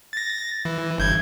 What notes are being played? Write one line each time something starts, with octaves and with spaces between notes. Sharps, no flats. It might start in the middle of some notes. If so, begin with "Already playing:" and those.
A6 A#6
E3
G1 G6 G#6